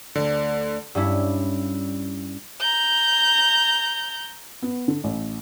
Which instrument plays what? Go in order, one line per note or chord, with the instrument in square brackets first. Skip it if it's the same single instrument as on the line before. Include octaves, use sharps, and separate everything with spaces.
[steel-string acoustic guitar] D2 D5 [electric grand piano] D3
[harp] G2 G3 C#4 E4
[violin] A#5 G6
[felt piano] B3
D3
A1